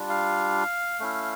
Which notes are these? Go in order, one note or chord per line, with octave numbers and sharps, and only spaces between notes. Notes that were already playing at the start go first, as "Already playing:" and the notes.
Already playing: G3 D4 F4
F5
A3 C#4 E4